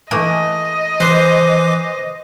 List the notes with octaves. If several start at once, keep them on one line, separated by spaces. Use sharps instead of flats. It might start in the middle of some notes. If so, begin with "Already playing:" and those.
E3 A3 A#3 D#5
E3 B4 C5 D6